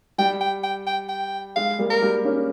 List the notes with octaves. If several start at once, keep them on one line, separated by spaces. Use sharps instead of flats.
G3 G5
G5
G5
G5
G5
G#3 F5
G3 A#3
A#4
G3 A#3
A#3 C#4